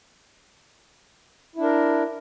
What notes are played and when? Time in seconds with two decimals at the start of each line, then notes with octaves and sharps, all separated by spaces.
1.56 E4
1.59 D4
1.63 A#4